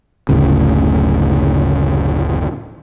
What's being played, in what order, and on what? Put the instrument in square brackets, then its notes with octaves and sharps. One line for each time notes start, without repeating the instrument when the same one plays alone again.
[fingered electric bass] F#1 D2 A2 C#3